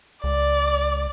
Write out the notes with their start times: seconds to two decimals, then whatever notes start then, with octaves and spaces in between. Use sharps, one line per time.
0.24 C#2 D5